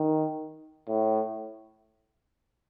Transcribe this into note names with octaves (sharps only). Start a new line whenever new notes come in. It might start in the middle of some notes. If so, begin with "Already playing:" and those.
Already playing: D#3
A2